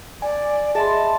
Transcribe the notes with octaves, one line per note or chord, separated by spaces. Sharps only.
D5 G#5
G#4 D#5 E5 A5 B5 C6